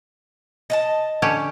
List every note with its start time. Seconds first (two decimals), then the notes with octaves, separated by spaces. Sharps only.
0.70 D#5 F5 A5
1.22 D3 C#4 G4